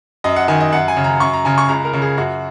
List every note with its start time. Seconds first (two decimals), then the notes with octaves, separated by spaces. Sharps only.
0.24 F#2 D#5
0.36 F#5
0.48 D#3 G#5
0.60 D#5
0.72 F#2 F#5
0.88 G#5
0.97 C#3
1.04 A#5
1.20 F#2 C#6
1.33 A#5
1.45 C#3 G#5
1.58 C#6
1.69 C#2 A#5
1.85 A#4
1.93 C#3
2.02 G#4
2.17 F#2 F#4